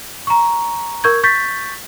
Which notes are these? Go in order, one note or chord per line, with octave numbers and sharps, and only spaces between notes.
A#5 C#6
A#4 C#6 G6 G#6
C#6 G6 A6 B6